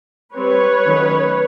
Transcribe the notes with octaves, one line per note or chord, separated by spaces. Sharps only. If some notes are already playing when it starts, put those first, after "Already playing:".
G3 C4 B4 C#5
D#3 F#3 A3 C#4